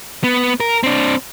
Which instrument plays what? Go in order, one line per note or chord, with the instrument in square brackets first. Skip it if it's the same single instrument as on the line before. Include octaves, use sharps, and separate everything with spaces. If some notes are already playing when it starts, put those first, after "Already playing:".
[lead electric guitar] B3
A#4
C4 D4